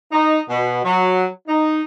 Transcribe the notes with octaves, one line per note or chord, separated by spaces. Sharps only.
D#4
B2
F#3
D#4